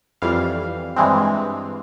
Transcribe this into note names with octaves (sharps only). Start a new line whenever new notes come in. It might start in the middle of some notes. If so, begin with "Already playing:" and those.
F2 E3 G3 F5
G2 E3 G#3 C4